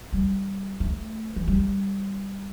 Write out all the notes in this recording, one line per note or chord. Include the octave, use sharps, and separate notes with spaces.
G3
A3
E3
G3